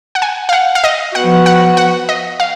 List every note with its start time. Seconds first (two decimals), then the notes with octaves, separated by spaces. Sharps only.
0.15 F#5
0.22 G#5
0.49 F5
0.53 F#5
0.75 F5
0.84 D#5
1.15 F3 B3 F#4 F#5
1.46 F#5
1.77 F#5
2.09 D#5
2.40 F5